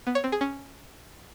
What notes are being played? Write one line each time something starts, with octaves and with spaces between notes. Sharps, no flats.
B3
C#5
C4
G#4
C#4